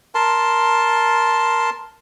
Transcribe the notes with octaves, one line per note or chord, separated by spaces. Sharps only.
A#4 A5 C6